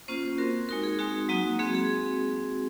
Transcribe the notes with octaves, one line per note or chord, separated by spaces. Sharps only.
A#3 C#4 F4 C5
C4 F#4 A#4
G#3 D#4 F#4 A#4
G#4
G#3 C4 D#4 F#4
F#3 A#3 D#4 F#4
G#3 C4 F#4 G#4
G#4